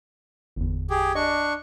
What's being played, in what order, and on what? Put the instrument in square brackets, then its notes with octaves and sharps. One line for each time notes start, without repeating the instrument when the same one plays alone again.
[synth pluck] G1 E2
[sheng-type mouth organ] G4 G#4
[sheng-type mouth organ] D4 C#6 [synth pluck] D#5